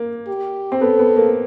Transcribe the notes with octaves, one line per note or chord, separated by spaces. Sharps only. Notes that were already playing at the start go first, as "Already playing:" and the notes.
Already playing: A#3
G4
C4
B3 A4
B3
A#3